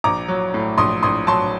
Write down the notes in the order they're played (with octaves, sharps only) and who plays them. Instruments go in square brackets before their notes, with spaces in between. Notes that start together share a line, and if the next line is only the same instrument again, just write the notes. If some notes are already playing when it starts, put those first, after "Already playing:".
[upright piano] A#1 A#5 D6
F#3
A2
A#1 C6 D#6
A#1 C6 D#6
F#3 A5 C6